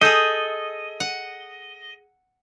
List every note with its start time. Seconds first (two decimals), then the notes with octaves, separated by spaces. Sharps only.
0.01 G#4 A4 D#5 D#6 G6
1.00 F#5